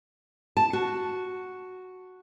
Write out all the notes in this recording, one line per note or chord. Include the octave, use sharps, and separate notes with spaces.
A5
F#4